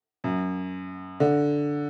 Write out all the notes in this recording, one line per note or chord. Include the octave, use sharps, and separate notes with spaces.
F#2
D3